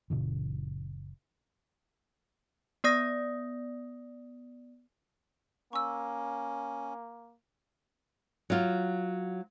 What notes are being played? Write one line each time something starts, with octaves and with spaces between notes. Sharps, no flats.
F#1 A#2 C#3 E3
B3 D5 D#6 A#6
A#3 C#4 C#6 E6
F#3 F4